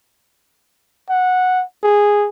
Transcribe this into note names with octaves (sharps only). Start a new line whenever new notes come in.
F#5
G#4